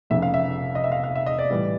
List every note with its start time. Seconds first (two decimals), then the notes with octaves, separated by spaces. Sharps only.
0.10 F1 F2 C#3 E5
0.22 F5
0.34 E5
0.75 D#5
0.84 E5
0.92 F5
1.04 F5
1.16 E5
1.26 D#5
1.38 D5
1.50 A2 E3 G3